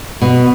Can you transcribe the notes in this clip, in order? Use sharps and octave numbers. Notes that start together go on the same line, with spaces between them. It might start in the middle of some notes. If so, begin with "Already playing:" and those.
B2